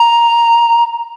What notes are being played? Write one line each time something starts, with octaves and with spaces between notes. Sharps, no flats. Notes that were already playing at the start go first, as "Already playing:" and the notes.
Already playing: A#5